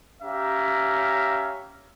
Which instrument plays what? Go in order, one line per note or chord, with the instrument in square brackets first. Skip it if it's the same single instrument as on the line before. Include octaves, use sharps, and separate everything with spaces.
[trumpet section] C#4 G4 E5 F5 A#5